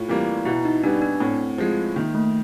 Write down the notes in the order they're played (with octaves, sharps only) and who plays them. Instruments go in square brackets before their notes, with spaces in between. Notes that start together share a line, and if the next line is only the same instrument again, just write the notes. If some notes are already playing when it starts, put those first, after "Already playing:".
Already playing: [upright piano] A2 [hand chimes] F4
[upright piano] E3 G3 A#3
[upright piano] B2 [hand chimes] E4
[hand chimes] D#4
[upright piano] G3 B3 [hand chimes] D4
[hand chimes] D4
[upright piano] A2 [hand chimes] C4
[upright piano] F3 G#3
[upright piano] D#3 [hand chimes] A#3
[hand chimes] A3